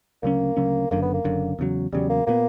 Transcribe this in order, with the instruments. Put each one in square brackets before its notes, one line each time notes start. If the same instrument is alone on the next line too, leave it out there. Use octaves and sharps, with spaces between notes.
[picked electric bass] D2 C#3 F#3 C#4 [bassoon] A#3
[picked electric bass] D2 C#3 F#3 C#4
[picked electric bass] F#1 F#2 D3 [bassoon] A#3
[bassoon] B3
A#3
[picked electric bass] F#1 F#2 D3
E2 C#3 F#3
[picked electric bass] E2 C#3 F#3 [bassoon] G3
[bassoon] A#3
[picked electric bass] A#2 G3 B3 [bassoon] A#3